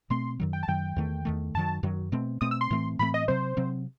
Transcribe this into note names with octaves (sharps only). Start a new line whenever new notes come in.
B2 A3 C4 C6
F#2 D#3 F#3
G5
A5
F#2 D#3 F#3 G5
E2 D#3 A3
E2 D#3 A3
F#2 D#3 F#3 A5
F#2 D#3 F#3
B2 A3 C4
B2 A3 C4 D#6
E6
C6
A2 E3 A3 C4
A2 E3 A3 C4 B5
D#5
C3 F#3 C4 C5
C3 F#3 C4